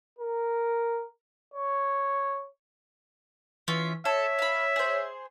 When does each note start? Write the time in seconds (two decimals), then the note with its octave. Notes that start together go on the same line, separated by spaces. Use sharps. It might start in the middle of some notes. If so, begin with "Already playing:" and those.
0.19 A#4
1.54 C#5
3.68 E3 C#4 F4 E5
4.05 A4 C#5 E5
4.39 F5 B5
4.76 G#4 C5